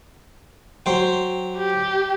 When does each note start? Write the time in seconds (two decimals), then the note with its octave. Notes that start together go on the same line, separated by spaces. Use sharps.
0.86 F#3 C5 G5
1.57 G4